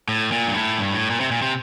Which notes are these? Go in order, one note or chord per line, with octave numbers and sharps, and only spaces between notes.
A2
A#2
G2
A2
G2
A2
A#2
C3
A#2
C3